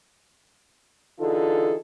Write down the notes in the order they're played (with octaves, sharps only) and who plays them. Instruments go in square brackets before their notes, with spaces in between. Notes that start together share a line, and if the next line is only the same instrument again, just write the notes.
[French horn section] D3 E3 D#4 F4 G#4 A4